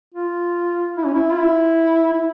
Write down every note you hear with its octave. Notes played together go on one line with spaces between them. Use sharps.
F4
E4
C#4
E4
F4
E4
E4